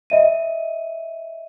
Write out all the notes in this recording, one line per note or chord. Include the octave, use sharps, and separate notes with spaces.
D#5 E5 D#7